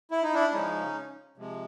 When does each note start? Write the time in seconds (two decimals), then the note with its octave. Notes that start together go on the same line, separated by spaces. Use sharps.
0.11 E4
0.23 D#4
0.34 D4 E4
0.53 C#3 F3 G#3 C#4 D#4
1.37 C3 F3 G#3